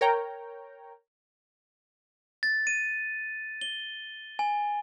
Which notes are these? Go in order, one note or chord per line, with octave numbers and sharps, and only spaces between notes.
A#4 C#5 G5 A#5
A6
D#7
G7
G#5